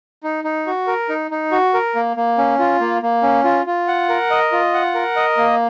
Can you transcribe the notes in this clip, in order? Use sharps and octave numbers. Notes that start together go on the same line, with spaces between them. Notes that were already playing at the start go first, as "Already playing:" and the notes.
D#4
D#4
F#4
A#4
D#4
D#4
F#4
A#4
A#3
A#3
C#4
F4
A#3
A#3
C#4
F4
F4
F#5
A#4
D#5
F4
F#5
A#4
D#5
A#3